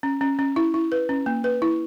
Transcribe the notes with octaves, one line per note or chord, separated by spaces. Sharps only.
C#4
C#4
C#4
E4
E4
B4
C#4
A#3
B4
E4